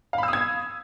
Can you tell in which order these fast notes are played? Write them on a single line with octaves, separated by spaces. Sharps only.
F5 B5 E6 D#6 G#6